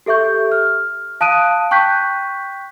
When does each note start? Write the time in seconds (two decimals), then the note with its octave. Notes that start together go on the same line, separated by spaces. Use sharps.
0.06 G4 A4 E5 C#6 G6
0.52 F6
1.21 F5 A5 D#6 F#6 D7 D#7
1.71 G5 C#6 F#6 G6 B6